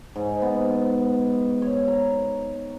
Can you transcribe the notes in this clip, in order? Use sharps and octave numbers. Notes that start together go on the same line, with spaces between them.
G#2
B3
C#5
A#5